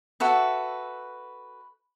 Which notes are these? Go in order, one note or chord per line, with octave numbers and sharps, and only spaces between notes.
F#4 A4 B4 E5